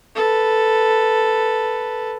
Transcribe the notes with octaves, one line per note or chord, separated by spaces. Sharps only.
A4 B4